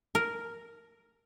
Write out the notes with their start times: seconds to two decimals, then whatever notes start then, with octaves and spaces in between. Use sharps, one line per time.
0.15 A#4